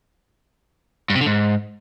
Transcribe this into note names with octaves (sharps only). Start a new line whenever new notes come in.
G2
C3
D3
G#2